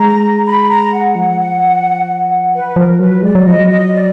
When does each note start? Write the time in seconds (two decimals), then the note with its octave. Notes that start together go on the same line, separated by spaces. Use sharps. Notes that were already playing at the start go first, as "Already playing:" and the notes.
Already playing: G#3 A#5
0.46 B5
0.69 A#5
0.92 F#5
1.15 F3
2.54 B4
2.76 F3 A#4
3.00 F#3 B4
3.23 G#3 D5
3.35 F#3
3.45 F3 D#5
3.59 F#3
3.69 D#5
3.92 D5